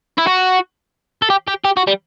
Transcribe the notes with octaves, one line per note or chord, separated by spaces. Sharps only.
E4
F#4
A4
G4
G4
G4
F#4
G3